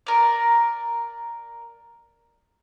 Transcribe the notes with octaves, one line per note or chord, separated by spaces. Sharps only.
A#4 D5